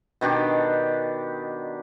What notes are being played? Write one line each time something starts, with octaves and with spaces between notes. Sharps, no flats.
B2 D#3 D4 G4